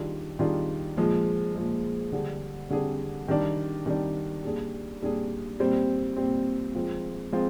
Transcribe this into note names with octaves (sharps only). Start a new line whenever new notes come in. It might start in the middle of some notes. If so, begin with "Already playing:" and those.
Already playing: D#3 G3 D4 F4 G#4
D#3 G3 D4 F4 G#4
A#2 F3 G#3
A#2 F3 G#3
D3 G3 D4 G#4
D3 G3 D4 G#4
D#3 G3 D4
D#3 G3 D4
A#2 G3 D4 G#4
A#2 G3 D4 G#4
A#2 G3 C4
A#2 G3 C4
F3 G#3 C4 F4
F3 G#3 C4 F4